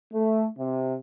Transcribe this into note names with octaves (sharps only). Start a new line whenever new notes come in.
A3
C3